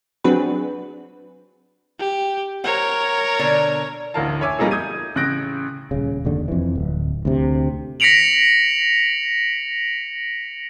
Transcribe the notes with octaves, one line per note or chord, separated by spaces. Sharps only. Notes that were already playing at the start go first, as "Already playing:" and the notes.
F#3 C4 D4 F#4 G#4 B4
G4
A#4 C5 C#5 F#5
B2 D3 D5
A1 D2 E4 A#4 F5 A5
C#5 E5 G#5 D6 E6
F3 G3 A#3 D#4 G#4 A4
D#6 G6 G#6 D#7
A1 C#3 F#6 G6 A#6 D7
D#1 C#3
F1 D#2 D3
F2 E3
D1
D2 C3
A#6 B6 C#7 D7 F7 F#7